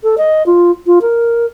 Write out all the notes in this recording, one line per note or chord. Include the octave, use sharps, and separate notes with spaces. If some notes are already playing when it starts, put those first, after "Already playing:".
A4
D#5
F4
F4
A#4